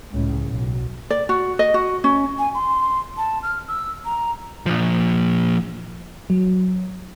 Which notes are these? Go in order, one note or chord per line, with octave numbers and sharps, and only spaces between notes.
C#2 A2 C#3
B1
D5
F#4
D#5
F#4
C#4
G#5
C6
A5
F6
E6
A#5
A#2 F3
F#3